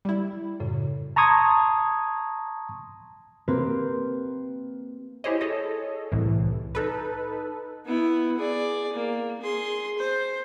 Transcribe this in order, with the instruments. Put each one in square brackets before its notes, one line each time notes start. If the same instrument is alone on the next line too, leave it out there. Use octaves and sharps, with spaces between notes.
[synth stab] G3 E4
[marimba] F#2 A2 C#3
[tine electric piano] A5 A#5 C6 C#6 D#6 G#6
[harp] A#3 C4 G4 B4
[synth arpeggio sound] E4 G4 G#4 C5 C#5 D#5
G#4 A4 C#5 D#5
C2 A2 E3
D#4 A4 B4
[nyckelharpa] B3 E4
G#4 D5
A#3
G#4 C6
C5